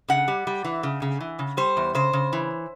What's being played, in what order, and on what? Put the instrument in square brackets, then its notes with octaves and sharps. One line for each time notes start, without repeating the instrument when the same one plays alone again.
[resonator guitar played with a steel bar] C#3 F#5
G3
G3
E3
C#3
C#3
E3
C#3
G3 C5
E2
C#3 C5
C#3
E3